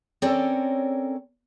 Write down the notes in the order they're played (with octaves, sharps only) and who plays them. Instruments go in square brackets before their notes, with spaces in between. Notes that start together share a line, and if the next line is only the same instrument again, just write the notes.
[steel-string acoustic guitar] C4 C#4 A4 A#4 C#5 D5